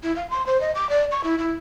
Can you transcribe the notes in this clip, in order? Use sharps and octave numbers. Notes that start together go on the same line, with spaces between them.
E4
F5
C6
C5
D#5
D6
D5
C#6
E4
E4